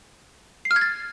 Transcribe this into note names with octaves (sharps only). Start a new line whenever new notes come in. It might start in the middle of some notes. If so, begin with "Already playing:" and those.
C7
F6
G#6
A6